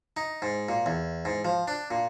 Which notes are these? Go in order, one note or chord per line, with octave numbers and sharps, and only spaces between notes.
D#4
G#2
A#2
E2
G#2
F3
D4
A#2